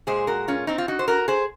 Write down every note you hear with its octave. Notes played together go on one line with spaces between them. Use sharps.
A#2 G#3 G#4 C5
F#4 A#4
C#4 F4
C4 D#4
F4
D#4 F#4
C5
F#4 A#4
G#4 C5